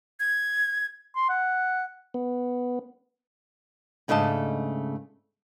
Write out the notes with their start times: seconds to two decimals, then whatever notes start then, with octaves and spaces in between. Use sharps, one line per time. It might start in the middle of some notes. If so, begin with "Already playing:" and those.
0.20 G#6
1.15 C6
1.29 F#5
2.14 B3
4.08 G#2 C#3 A3 D4 D#5 A5